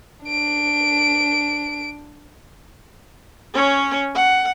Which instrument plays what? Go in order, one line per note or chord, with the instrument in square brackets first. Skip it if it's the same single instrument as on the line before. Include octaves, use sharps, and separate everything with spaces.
[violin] D4 D7
[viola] C#4 C#5
F#5